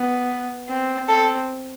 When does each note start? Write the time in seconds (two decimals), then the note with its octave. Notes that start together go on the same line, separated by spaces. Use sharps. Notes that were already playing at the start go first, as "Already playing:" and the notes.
Already playing: B3
0.69 C4
1.09 C4 A4